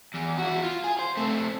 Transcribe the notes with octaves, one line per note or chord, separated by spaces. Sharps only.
E2
E4 F#4
F4
G#4
C5
A3 C4